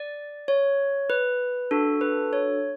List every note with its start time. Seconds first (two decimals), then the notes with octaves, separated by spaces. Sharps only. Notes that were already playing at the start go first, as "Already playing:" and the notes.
Already playing: D5
0.48 C#5
1.10 B4
1.71 D4 F#4 A4
2.01 B4
2.33 C#5